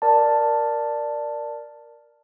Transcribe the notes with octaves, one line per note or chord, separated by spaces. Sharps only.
A#4 D5 A5